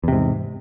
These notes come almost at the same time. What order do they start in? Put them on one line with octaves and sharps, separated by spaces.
E2 C3 G#2